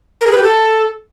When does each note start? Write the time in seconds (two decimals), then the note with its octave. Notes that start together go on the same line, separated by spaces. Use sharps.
0.21 A#4
0.27 G#4
0.32 B4
0.38 G4
0.43 A4